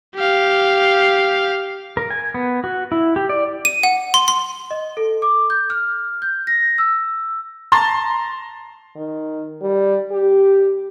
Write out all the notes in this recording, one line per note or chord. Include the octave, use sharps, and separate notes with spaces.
G4 F5
A#4
G#5
B3
F#4
E4
G4
D5
D#7
F#5
C6
C6
D#5
A4
D6
G6
F6
G6
A#6
E6
A5 A#5 C6 A6
D#3
G3
G4